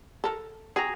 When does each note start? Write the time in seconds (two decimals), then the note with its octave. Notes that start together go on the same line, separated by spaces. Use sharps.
0.24 A4 A#4
0.76 C4 F#4 G#4 A#5